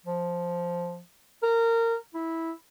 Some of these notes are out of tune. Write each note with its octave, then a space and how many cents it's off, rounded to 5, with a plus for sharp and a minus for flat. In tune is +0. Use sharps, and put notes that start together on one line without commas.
F3 +0
A#4 -20
E4 -10